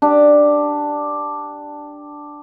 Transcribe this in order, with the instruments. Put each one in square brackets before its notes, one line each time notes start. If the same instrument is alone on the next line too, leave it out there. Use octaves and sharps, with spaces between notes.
[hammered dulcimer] D4 G4